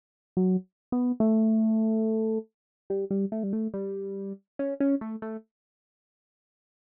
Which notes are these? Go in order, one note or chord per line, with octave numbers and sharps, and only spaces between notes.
F#3
B3
A3
G3
G3
A3
G3
A3
G3
C#4
C#4
A3
A3